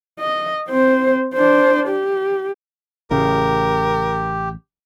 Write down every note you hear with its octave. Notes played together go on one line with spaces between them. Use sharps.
D#5
C4 C5
D4 C5
G4
A1 C#3 G4 A#4